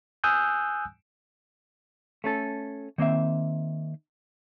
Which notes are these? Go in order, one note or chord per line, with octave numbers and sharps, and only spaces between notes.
G#5 D#6 E6 F#6 G6
A3 C#4 A4
D#3 A#3 C4 E5